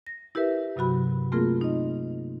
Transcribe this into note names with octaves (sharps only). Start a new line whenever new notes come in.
A#6
E4 G4 A#4 B4 E5
G2 C3 F#3 F#4 B5
A3 A#3 C4 F4 G#4 A#4
D#4 D#5